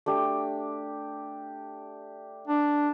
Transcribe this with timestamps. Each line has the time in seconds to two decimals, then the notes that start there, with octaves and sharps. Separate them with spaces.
0.06 A3 D4 G4
2.47 D4